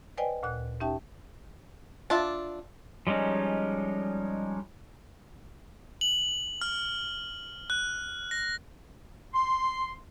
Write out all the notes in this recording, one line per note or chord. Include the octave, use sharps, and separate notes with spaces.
B4 C5 D5 D#5 G5 G#5
D2 A#2 F#6
C#4 D#4 G4 E5 G5 A5
D4 F4 E5
F3 G3 G#3 C#4 D#4
F#7
F6
F#6
A#6
C6